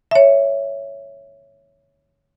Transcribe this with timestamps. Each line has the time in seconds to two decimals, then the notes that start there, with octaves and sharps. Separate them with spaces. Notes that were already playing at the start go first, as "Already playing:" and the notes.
0.11 C#5 E5